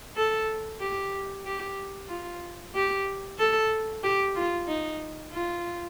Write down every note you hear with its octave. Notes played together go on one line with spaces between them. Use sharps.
A4
G4
G4
F4
G4
A4
G4
F4
D#4
F4